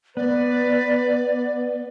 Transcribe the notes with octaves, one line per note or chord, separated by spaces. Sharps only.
B3 B4 D5